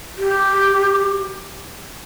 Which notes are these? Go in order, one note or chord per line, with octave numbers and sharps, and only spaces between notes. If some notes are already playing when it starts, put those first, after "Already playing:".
G4